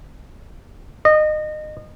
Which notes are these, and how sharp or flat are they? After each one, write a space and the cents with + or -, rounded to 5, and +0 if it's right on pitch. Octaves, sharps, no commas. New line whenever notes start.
D#5 -25